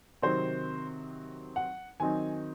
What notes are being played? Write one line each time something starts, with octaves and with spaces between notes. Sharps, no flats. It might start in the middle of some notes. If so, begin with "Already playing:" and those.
C3 D#3 F#3 C4 C5
F#5
D#3 F#3 C4 D#4 G#5